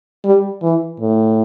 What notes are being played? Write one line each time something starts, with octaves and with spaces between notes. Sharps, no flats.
G3
E3
A2